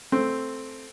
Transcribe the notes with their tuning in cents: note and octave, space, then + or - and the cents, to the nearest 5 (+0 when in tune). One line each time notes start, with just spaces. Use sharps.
A3 +0 C4 +0